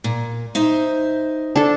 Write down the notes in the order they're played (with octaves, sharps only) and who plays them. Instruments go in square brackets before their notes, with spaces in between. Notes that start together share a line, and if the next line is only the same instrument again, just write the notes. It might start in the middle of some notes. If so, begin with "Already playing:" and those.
[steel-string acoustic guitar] A#2
D#4 C5 E5
[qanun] D4 A4